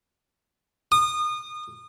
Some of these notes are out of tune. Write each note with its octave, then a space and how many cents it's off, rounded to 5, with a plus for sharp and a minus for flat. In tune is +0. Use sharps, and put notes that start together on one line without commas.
D#6 -30